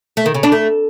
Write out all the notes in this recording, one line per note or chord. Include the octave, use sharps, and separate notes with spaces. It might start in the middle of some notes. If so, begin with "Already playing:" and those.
A3
D#3
C#3
D4
A3